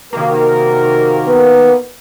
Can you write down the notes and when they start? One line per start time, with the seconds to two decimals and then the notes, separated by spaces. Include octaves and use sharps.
0.13 C3 D#3 A#3 F#4 A#4
1.27 B3